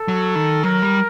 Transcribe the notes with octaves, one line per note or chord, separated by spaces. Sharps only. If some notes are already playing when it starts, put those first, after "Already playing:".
Already playing: A4
F#3
D#3
F#3 A#4
G3